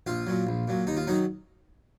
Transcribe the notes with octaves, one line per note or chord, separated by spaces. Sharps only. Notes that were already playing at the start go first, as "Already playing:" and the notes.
A#1 F4
A#2 F#3
A#1
A#2 F#3
D#2 D#4
F4
D#3 F#3 D#4